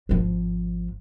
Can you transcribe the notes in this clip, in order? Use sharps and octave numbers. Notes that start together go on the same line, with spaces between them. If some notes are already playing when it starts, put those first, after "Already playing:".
G#1 F3